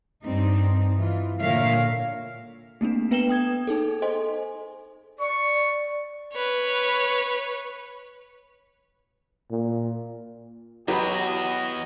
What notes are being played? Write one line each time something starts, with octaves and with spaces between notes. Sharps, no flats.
G2 G3 C4 D#4
E3 F4
A#2 D3 A#4 C#5 E5 F5
A3 A#3 C4 D4
B3 B4 G5 E7 G7
G5 D#6 G#6
D#4 G#4 A4
A4 C5 D#5 G#5 C6
D5 C#6
B4 C#5
A#2
E2 F#3 F#4 G4 B4 D#5 B5